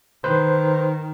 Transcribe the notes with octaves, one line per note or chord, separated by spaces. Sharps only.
D#3 B4 C5